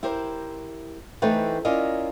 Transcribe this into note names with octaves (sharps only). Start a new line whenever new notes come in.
E4 G4 A#4 C5
E3 A3 C4 D#4 A4 B4
C#4 E4 F4 A#4 D5 D#5